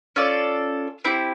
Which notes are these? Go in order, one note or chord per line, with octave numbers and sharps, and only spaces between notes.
C#4 F4 A4 D5
C4 E4 G4